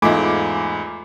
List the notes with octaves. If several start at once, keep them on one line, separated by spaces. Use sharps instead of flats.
E2 G#2 A3 F4 D#5 G#5 B5 D6